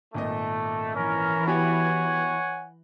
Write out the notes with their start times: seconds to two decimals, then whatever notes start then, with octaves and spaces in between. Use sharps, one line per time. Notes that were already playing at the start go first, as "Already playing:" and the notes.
0.14 G#1 A#2 A3 D#5
0.95 E3 C#4 A#4
1.47 B3 F#4 G4 C#5 F#5 G#5